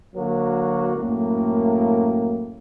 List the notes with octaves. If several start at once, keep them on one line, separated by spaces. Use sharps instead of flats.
D3 F#3 A#3 F#4
F#2 A2 A#3